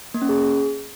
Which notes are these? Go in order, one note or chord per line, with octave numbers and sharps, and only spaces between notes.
A#3
C#4
G#4